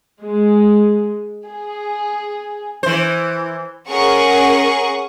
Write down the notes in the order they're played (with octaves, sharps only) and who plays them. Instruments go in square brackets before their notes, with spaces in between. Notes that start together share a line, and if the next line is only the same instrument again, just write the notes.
[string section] G#3
G#4
[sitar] E3 C5
[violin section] C#4 G#4 A#4 F#5 C#6